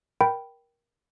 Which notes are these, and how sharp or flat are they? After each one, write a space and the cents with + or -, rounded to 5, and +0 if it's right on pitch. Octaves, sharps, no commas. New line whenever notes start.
A#4 +20 G5 -5 B5 +0